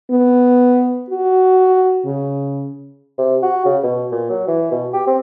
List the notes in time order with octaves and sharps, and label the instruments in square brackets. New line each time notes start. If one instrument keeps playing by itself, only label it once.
[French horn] B3
F#4
C#3
[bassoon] C3
F#4
C#3
B2
A#2
F#3
E3
B2
G4
C4